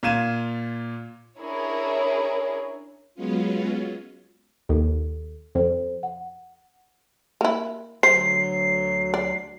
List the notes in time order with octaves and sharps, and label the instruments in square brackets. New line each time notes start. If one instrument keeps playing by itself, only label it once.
[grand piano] A#2 F4 F5 G#6 D#7 E7
[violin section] C#4 D4 E4 G#4 A#4 C#5
[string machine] F#3 G#3 B3 C#4 F4
[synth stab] D#2 [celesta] A4
[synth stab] F2 [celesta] A4 C5
[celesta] F#5
[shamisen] A#3 E4
[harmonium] D2 F#3 [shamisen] C5 [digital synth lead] C7
[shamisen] D5